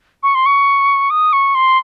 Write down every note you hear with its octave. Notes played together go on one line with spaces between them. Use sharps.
C#6
C6
C#6
D#6
C#6
C6